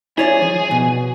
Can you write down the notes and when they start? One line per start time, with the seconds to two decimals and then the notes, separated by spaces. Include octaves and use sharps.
0.18 E4 G#4 C#5 D5
0.42 F3
0.71 B2